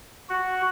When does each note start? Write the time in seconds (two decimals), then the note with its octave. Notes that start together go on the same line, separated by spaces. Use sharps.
0.30 F#4